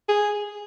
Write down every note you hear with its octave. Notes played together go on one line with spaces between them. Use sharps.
G#4